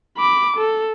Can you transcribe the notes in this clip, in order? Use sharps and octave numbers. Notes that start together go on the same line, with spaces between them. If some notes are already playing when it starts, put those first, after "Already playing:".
B5 D6
A4